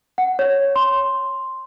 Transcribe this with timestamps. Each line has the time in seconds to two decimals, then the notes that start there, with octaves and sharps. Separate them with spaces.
0.18 F#5
0.39 C#5
0.76 C6